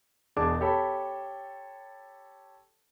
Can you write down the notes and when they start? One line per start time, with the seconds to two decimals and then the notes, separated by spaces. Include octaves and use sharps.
0.36 E1 E2 D4 G#4 A5 D6
0.61 G4 A4 C#5 A5 B5